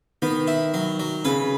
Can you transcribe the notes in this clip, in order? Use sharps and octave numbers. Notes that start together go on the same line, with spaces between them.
D#3 B3
E4
F#3
F#3
C#3 B4